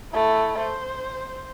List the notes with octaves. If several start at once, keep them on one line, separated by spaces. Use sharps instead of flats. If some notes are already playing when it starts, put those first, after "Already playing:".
A3 E4
C5